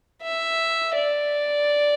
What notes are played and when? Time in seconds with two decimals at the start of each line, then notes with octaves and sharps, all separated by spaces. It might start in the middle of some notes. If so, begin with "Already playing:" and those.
0.22 E5
0.95 D5